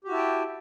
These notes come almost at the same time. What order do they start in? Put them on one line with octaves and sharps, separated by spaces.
G4 F#4 E4 A5 G5